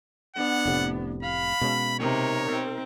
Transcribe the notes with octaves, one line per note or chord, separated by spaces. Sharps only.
B3 D4 F#5
F1 A2 C3
F5 B5
B2 G#3 C#4
C3 D#4 A#4 C#5
C4